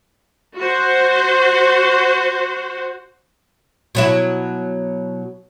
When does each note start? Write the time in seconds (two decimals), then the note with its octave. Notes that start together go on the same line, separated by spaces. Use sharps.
0.58 F#4 C5
3.95 B2 F#3 E4